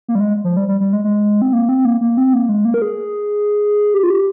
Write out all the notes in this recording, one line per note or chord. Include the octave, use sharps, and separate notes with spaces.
A#3
G3
G#3
F3
G3
G3
G3
G#3
G#3
C4
A#3
C4
A#3
A#3
C4
A#3
G#3
A#3
A#4
G#4
G4
F4
G4